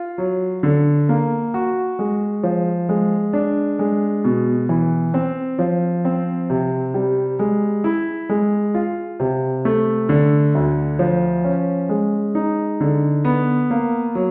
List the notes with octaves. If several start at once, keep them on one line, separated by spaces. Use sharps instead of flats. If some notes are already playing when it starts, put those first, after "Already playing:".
Already playing: F4
F#3
D3
A#3
F#4
G#3
F3
G#3
D4
G#3
B2
E3
C4
F3
C4
C3
G3
G#3
E4
G#3
F4
C3
A3
D3
D2
F3
C#4
G#3
D#4
D3
B3
A#3
F#3